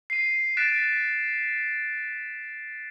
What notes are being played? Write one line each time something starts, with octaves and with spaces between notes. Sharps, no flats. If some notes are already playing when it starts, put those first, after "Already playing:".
C7 D#7
F#6 A6 B6 D7 E7